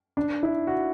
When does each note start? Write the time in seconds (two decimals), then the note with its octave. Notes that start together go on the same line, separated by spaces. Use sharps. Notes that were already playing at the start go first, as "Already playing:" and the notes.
0.17 D4
0.43 E4
0.67 F#4